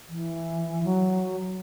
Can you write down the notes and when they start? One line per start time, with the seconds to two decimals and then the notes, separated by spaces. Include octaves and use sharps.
0.09 E3
0.84 F#3